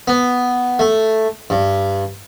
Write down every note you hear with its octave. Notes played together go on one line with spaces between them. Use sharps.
B3
A3
G2